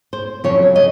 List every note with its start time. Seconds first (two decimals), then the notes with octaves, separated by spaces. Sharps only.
0.13 C5
0.44 F2 C#3 F#3 C#5
0.76 D#5